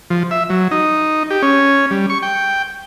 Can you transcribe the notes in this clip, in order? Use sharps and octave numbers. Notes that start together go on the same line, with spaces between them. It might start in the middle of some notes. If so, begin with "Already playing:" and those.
F3
E5
F#3
D#4
G4
C#4
G3
C#6
G5